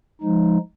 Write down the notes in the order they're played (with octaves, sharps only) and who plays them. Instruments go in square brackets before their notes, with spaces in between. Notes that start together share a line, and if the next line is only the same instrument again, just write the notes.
[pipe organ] F3 G#3 D#4